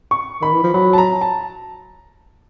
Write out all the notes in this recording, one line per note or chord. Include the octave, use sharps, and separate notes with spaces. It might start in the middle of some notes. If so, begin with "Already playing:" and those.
C#6
D#3 B5
E3
F3
F#3 B5
A5
A#5
A5